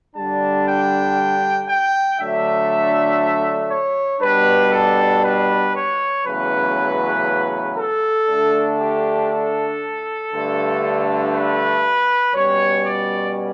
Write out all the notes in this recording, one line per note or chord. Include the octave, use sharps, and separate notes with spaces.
D3 G3 D4 A5
G5
G5
D3 F#3 A3 D4 E5
C#5
B2 G3 D4 B4
A4
B4
C#5
E2 C#3 F#3 A3 C#4 B4
A4
D3 A3 D4
G4
A4
G2 D3 A3
B4
B2 G3 C#4 C#5
D5